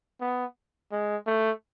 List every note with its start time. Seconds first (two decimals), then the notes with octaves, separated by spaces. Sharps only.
0.21 B3
0.92 G#3
1.26 A3